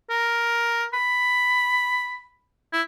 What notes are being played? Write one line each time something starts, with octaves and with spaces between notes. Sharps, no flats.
A#4
B5
E4